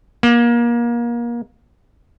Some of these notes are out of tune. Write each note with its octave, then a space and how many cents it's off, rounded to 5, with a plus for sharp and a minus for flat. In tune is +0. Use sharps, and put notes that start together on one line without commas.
A#3 +30